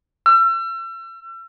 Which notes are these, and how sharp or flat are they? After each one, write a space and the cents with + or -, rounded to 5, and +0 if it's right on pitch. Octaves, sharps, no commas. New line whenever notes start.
E6 +40